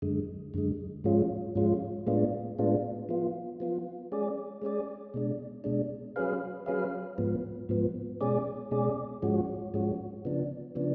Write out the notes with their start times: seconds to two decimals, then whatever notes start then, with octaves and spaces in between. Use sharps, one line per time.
0.02 F#2 D3 G#3
0.54 F#2 D3 G#3
1.04 G#2 F3 G#3 C#4 F4
1.55 G#2 F3 G#3 C#4 F4
2.06 A2 G#3 B3 D4 F4
2.59 A2 G#3 B3 D4 F4
3.09 F3 B3 F4
3.60 F3 B3 F4
4.12 G#3 C#4 G#4 D5
4.62 G#3 C#4 G#4 D5
5.14 B2 G#3 D4
5.64 B2 G#3 D4
6.16 F#3 C#4 G#4 B4 F5
6.66 F#3 C#4 G#4 B4 F5
7.18 G#2 F3 B3
7.69 G#2 F3 B3
8.21 B2 G#3 C#4 G#4 D5
8.71 B2 G#3 C#4 G#4 D5
9.22 G#2 F3 G#3 C#4 F#4
9.74 G#2 F3 G#3 C#4 F#4
10.25 C#3 F3 B3 D4
10.75 C#3 F3 B3 D4